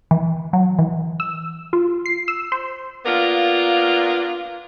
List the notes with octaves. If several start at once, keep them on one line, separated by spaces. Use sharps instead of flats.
E3
F#3
E3
E6
F4
C7
E6
C5
A#3 B3 D4 F4 A#4